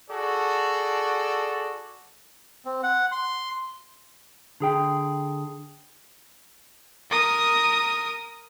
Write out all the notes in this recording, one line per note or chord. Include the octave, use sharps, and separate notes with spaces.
F#4 G#4 A4 D5
C4
F#5
C6
D3 G#4 G5
A#4 D#6